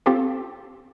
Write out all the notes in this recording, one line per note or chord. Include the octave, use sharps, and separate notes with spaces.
C4 F4 G4 A4